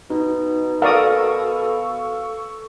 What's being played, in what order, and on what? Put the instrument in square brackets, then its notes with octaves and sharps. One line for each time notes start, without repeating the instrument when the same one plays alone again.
[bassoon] B2 [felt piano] D#4
[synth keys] A4 C#6 E6 [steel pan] A#4 D5 D#6 [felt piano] F5